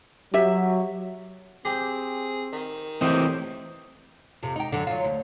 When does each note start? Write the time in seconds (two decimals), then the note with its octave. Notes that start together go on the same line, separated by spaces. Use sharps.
0.34 F#3 G4 E5
1.65 C4 G4 G#4
2.53 D#3
3.01 A2 E3 C4 G4 C5 D#5
4.43 F2 C3
4.56 D#4 G4
4.72 F#2 D3
4.87 F#3 F4
5.04 D2